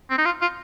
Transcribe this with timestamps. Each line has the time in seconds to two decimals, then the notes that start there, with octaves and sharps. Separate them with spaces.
0.10 C4
0.18 D#4
0.25 F4
0.41 F4